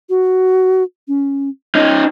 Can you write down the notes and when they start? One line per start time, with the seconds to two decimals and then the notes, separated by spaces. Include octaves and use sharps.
0.09 F#4
1.08 C#4
1.75 C#4 D#4 D#5